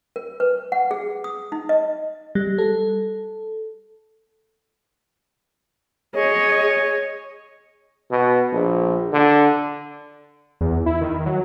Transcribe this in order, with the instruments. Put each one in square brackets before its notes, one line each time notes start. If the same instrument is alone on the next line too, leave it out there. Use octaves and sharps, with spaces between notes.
[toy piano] A#4
B4
F#5
G#4
D#6
D#4
D#5
[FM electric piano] G3
A4
[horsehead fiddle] G#4 D#5 [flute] C#5
[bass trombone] B2
A#1
D3
[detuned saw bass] E2
E4
D#3
F#3